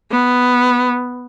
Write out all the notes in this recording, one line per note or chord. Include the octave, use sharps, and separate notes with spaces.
B3